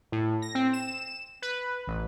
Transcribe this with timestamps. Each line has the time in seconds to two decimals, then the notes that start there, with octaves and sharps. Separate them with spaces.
0.12 A2
0.42 A#6
0.55 C4
0.73 E7
1.42 B4
1.87 A1